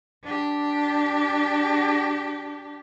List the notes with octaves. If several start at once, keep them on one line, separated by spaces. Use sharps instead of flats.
D4 G4